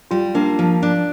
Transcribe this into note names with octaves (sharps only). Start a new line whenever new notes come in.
G3 F4
A#3 D4
F3
D4